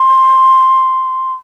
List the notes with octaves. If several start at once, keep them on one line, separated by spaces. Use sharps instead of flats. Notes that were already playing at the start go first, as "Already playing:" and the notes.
Already playing: C6